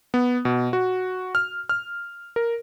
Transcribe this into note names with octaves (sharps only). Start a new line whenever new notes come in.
B3
B2
F#4
F6
F6
A#4